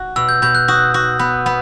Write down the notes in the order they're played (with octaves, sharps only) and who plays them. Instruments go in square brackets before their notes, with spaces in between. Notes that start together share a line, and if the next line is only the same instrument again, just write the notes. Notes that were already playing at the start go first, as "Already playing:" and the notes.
Already playing: [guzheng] F#4
[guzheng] B2 [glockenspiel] E6
[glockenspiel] G6
[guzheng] B2 [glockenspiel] G6
[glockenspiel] F#6
[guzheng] F#4 [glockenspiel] D#6
[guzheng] F#4
B3
B3